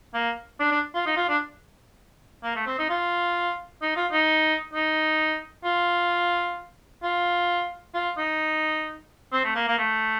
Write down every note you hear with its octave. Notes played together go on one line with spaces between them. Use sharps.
A#3
D4
D4
F4
D#4
F4
D4
A#3
A3
C4
D#4
F4
D#4
F4
D#4
D#4
F4
F4
F4
D#4
C4
A3
A#3
A#3
A3